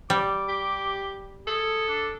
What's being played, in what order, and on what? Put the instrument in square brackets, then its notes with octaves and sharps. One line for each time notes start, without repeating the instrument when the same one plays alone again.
[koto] G3 [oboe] D6
[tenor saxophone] G4
[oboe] G#4 [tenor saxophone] A4
[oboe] D4